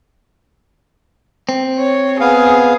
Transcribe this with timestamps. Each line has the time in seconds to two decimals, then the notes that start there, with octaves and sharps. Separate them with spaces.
1.49 C4
1.79 C#5
2.20 B3 G#4 F5